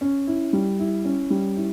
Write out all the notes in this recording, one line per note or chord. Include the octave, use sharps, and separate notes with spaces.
C#4
E4
G3
E4
C#4
G3
E4